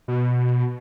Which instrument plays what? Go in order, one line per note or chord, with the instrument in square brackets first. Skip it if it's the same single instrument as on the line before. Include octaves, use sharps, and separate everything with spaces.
[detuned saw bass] B2